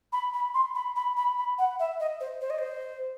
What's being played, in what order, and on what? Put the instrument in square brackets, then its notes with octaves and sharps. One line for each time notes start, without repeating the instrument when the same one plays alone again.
[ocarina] B5
B5
C6
B5
B5
B5
B5
F#5
E5
D#5
C5
C5
D#5
C5